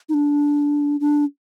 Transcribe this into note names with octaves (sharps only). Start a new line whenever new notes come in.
D#4
D4
D4